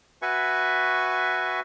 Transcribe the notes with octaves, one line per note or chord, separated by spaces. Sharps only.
F#4 B4 E5 G#5 C#6